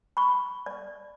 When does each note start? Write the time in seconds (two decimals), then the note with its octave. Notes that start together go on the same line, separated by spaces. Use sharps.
0.17 B5 C#6
0.66 D5